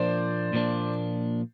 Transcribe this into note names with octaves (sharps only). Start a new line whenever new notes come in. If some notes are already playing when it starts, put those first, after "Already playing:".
Already playing: A#2 F3 A#3 D4 C5 D5
A#2 F3 A#3 D4